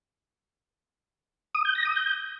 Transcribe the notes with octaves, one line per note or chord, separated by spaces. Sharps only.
D#6
G6
A#6
D#6
G6